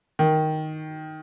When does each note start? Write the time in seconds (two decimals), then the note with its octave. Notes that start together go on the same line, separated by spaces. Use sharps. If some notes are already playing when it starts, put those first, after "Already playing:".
0.19 D#3